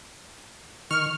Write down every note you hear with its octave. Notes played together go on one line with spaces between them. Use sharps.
D#3 C#6 F6